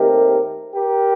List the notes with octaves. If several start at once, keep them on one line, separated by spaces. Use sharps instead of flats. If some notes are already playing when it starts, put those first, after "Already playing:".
Already playing: D#2 D#3 A3 C4 G4 A#4
G4 A#4